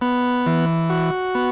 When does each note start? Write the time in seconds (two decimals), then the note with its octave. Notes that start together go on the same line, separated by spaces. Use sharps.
0.01 B3
0.46 E3
0.90 F#4
1.35 B3